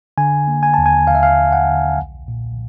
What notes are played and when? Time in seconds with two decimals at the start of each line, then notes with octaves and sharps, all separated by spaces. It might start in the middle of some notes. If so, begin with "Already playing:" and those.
0.18 D3 G#5
0.48 A#3
0.63 G#5
0.74 D#2 A5
0.86 G#5
1.07 D#2 F5
1.15 E5
1.23 F5
1.38 D#2
1.52 F#5
1.69 D3
1.98 B1
2.28 A#2